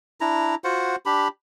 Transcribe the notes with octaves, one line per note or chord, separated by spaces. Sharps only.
D4 E4 A#5
F4 F#4 C5 F#5
D4 G4 B5